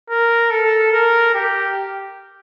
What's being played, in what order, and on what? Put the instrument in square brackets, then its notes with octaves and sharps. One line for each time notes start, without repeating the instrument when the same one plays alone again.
[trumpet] A#4
A4
A#4
G4